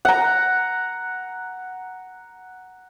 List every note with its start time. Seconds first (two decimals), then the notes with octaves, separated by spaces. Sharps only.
0.05 F#5 A#5